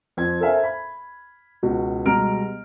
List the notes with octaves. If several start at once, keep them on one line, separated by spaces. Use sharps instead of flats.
F2 C4 G#6
A4 A#4 C5 E5 F5 G#5
B5
C#2 B2 F#4
B2 G3 G#3 A#5 F6 D7